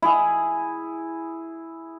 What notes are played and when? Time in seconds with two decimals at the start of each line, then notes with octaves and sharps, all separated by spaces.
0.02 E4 G#4